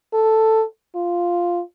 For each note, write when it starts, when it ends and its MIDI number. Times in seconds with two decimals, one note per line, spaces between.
0.14 0.64 69
0.95 1.61 65